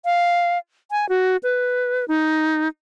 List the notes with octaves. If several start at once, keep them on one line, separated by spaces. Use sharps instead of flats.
F5
G#5
F#4
B4
D#4